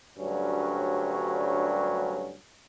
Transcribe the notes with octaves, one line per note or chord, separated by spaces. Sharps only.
D2 G2 F#3 G3 C#4